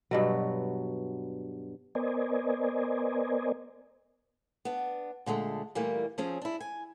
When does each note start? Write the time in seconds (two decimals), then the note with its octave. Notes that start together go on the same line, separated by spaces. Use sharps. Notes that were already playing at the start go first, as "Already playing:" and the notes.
0.11 G2 B2 F#3
1.95 B3 A#4 C5 D5 D#5 G#5
4.65 B3 D4
5.26 A#2 D3 G#3 A3
5.75 A#2 E3 G3 A3 A#3
6.18 F3 C4 C#4 G#4
6.41 D4 E4
6.60 G#5